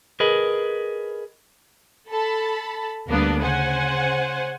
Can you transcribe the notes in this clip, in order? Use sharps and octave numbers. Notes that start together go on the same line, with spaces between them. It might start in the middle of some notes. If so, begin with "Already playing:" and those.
G#4 A#4 B4 D#5
A4 A5 B5
D2 G3 A#3 B3 D4
C#3 C5 F#5 G#5